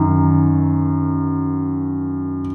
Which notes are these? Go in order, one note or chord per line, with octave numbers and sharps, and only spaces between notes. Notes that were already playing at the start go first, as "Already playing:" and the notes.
Already playing: F#2 D#3